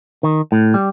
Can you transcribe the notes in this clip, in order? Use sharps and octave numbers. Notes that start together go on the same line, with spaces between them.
D#3
A2
G3